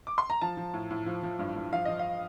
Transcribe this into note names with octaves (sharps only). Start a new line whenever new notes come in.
D6
C6
A#5
F3 A5
F3
A2
A2
F3
F3
G2
G2
F3 F5
F3 D#5
F5